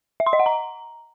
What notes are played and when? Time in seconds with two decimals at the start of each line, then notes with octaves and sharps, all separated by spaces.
0.20 E5
0.26 C6
0.33 D#5
0.40 F#5
0.46 A#5